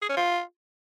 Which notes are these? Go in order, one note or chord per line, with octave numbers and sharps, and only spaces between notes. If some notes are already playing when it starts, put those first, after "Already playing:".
G#4
C#4
F4